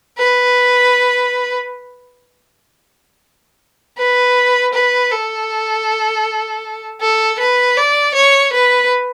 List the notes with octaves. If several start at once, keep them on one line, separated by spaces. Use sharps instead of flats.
B4
B4
B4
A4
A4
B4
D5
C#5
B4